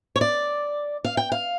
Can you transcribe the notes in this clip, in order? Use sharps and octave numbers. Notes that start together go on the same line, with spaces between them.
C#5
D5
F5
G5
F5